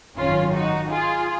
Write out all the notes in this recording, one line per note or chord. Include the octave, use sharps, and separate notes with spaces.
G#1 F#2 D#3 C#4 F4
D#4 F#4
F4 G#4